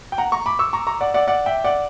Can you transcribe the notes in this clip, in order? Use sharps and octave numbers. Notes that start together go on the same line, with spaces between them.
G5
F#5 A#5
A#5 C#6
B5 D6
C#6 E6
A#5 C#6
A#5 C#6
D5 F#5
D5 F#5
D5 F#5
E5 G5
D5 F#5